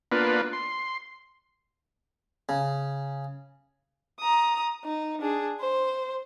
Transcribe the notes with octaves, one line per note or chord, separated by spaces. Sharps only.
A#3 B3 D4 F4 B4
C6
C#3
A#5 D#6
D#4
D4 G#4
C5